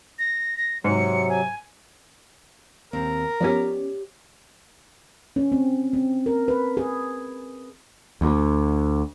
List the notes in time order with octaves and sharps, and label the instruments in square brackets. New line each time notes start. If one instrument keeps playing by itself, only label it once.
[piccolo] A#6
A#6
[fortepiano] G#2 [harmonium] C3 F#3 [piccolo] C#7
[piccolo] G#5
[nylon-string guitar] D#2 C4 [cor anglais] A#4
[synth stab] F3 B3 C#4 [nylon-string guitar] G4 C#5 D5
[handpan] C#4
C4
C4
A#4
B4
G#4
[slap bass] D2